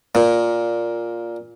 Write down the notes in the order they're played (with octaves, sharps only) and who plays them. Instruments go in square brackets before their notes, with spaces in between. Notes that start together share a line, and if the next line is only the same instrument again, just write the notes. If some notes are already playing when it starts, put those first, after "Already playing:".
[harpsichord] A#2